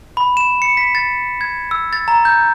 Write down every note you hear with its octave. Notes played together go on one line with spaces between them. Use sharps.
B5
E7
C#7
B6
A6
G#6
E6
A6
A#5
G6